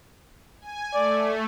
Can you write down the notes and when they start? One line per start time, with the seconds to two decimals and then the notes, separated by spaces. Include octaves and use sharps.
0.61 G#5
0.94 A3 D5